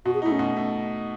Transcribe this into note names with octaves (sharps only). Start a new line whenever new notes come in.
B2 F#4
G#4
A3 D#4 E4
C#4
B2
A3